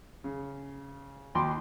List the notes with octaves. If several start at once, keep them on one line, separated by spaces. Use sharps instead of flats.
C#3
D#2 F#4 G5 B5 C6 D6